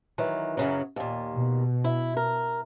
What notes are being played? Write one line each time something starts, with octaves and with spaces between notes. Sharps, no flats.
D#3 E3 F#3
F#2 C#3 F#3
D#2 A#2
B2
E4
A#4